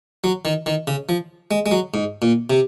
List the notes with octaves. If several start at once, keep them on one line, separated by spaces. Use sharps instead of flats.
F#3
D#3
D#3
C#3
F3
G#3
G#3
F#3
G#2
A#2
C3